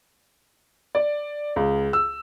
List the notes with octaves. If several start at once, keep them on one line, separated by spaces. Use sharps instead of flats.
D5
C#2
E6